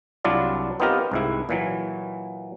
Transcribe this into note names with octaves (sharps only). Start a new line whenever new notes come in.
C2 F#3 D4 E4 F4 D5
B3 C4 D#4 F4 G4 A#4
C2 G#2 E4
A#2 E3 F#3